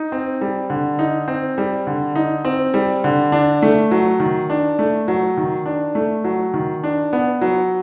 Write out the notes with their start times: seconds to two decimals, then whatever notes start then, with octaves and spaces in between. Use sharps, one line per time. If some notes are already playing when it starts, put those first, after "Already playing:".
Already playing: D#4
0.12 C4
0.41 G3
0.70 D3
0.99 D#4
1.28 C4
1.58 G3
1.87 D3
2.16 D#4
2.45 C4
2.74 G3
3.04 D3
3.32 D4
3.62 A3
3.91 F#3
4.20 D#3
4.50 D4
4.79 A3
5.08 F#3
5.37 D#3
5.66 D4
5.95 A3
6.24 F#3
6.54 D#3
6.84 D4
7.13 B3
7.41 F#3